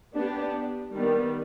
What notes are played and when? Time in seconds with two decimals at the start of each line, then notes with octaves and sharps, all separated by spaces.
0.14 B3 D4 G4
0.93 D#3 G3 B3